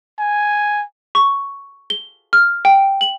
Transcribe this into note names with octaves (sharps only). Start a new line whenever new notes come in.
G#5
C#6
G7
F6
G5
F#7